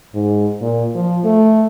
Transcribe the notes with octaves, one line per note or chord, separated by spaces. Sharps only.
G#2
A#2
F3
A3